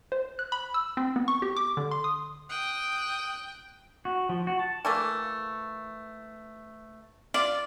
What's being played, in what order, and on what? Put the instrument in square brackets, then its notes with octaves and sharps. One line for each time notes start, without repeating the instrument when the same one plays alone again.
[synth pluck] C5
F#6
B5
E6
C4
B3
C#6
G4
D6
D3
C6
D#6
[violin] G5 [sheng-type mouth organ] D#6 F#6
[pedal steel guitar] F#4
F3
F#4
A5
[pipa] E3 A3 A#3
[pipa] F4 [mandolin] D5